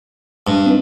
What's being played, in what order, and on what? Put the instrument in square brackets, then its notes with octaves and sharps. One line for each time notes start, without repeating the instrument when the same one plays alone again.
[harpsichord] G2
[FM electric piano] C4 D#4 B4